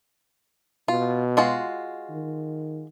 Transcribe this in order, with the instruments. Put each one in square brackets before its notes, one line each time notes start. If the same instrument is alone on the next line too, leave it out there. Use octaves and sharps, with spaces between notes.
[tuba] B2 [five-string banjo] F4
[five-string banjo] G#3 F4 F#4
[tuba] D#3